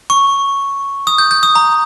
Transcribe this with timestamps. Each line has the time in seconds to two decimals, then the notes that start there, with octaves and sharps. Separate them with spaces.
0.10 C#6
1.07 D#6
1.18 G6
1.31 G6
1.43 D#6
1.55 A#5